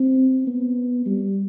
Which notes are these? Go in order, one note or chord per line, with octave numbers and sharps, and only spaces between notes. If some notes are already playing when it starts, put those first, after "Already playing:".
Already playing: C4
B3
G3